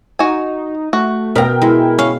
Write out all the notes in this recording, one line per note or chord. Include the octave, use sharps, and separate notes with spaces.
D#4 F#4 G#5
A3 F#4
B2 A#4 G5 A#5
G#3 E4
C#4 F5